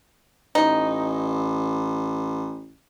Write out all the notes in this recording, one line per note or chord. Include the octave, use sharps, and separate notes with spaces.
A1 D#4